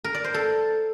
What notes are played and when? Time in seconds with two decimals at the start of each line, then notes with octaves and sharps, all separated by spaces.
0.04 A#4
0.14 D5
0.24 C5
0.34 A4